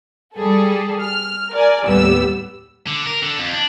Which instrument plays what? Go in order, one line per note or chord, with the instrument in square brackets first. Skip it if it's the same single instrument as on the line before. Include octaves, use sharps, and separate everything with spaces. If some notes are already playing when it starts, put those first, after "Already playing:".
[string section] G3 G#4 A4
F6
A#4 D5 G#5
D#2 A2 G3 B3 E6
[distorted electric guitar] D3
A#4
D3
F2
D4